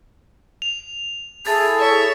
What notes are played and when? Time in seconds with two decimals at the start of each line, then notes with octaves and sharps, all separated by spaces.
0.62 F7
1.47 E4 G#4 A4 A6
1.77 C#5 E5